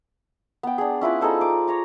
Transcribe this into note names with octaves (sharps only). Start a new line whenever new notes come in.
B3 G5
D4 G#4
C#4 E4 F4 B4
D#4 G#4 A4 C5
D6
C#5 A#5 D6